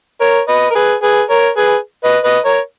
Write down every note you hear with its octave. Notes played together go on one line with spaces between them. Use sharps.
A#4 C#5
B4 D#5
A#4
G#4 B4
G#4 B4
A#4 C#5
G#4 B4
B4 D#5
B4 D#5
A#4 C#5